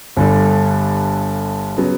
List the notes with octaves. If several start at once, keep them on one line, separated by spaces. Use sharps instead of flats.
G1 G2 D3 G3
C#3 F#3 B3